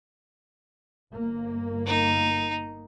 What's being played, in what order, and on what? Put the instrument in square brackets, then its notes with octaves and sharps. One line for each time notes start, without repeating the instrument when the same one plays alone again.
[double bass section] G1 A#3
[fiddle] D#4